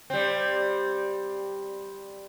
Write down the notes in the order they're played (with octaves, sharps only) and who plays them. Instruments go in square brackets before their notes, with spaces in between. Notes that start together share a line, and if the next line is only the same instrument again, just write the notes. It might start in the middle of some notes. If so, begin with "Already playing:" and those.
[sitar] G3 C4